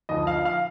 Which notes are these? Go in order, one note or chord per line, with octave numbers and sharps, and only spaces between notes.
D2 D3 F3 D#5
F5
F5